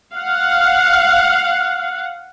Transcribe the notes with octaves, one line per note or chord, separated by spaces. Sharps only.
F5 F#5